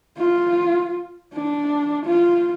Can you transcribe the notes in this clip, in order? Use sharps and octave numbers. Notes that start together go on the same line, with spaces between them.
F4
D4
F4